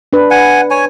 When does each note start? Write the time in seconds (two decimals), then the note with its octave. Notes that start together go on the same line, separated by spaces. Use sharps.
0.13 D4 B4
0.31 F#5 G#5
0.71 C#5 G#5